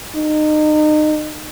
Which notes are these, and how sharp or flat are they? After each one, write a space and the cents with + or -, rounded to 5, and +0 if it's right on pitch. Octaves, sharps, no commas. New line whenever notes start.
D#4 -30